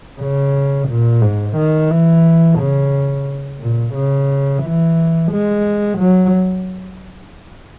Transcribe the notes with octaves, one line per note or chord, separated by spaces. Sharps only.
C#3
A#2
G#2
D#3
E3
C#3
A#2
C#3
E3
G#3
F#3